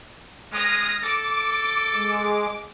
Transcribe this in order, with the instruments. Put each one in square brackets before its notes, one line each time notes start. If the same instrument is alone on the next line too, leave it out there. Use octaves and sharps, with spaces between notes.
[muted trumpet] G#3 [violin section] D#6 F6 A#6
[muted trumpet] A4 [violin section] D6
[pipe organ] G#3